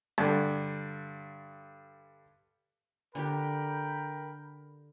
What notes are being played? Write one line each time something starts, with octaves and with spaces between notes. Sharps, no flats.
G2 D3
D3 D4 G4 A#4 G5 B5